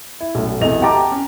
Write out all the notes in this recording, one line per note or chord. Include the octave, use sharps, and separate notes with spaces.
E4
B1 F#2 A3
B1 E2 C3 A4 D#5 F7
G4 F#5 G5 A5 A#5 D6
C#4